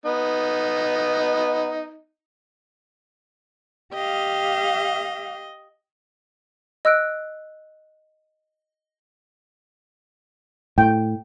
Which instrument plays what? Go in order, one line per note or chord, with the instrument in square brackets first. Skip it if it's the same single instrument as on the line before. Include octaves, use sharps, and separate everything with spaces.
[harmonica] B3 D#4
[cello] G4 F5 [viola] D#5
[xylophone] D#5 E6 F#6 D7
[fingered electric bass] A2 [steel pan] G5